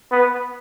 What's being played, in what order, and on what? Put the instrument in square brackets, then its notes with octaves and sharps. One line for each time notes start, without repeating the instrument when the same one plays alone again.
[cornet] B3